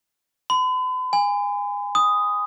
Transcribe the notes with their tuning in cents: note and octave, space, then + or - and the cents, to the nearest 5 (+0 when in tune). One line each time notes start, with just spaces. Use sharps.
B5 +45
G#5 -25
D#6 +0